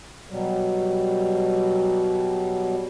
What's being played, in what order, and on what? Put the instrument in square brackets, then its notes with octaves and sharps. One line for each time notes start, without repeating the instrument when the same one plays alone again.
[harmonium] B2 F#3 G3